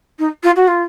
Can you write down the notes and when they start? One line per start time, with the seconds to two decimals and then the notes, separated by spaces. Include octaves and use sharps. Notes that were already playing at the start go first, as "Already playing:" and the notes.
0.18 D#4
0.43 F4
0.56 F#4
0.67 F4